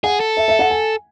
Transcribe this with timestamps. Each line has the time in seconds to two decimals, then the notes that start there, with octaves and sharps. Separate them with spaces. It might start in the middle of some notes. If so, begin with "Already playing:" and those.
0.04 G#4 F#5
0.20 A4
0.37 E5
0.48 E5
0.59 F#5
0.70 G#5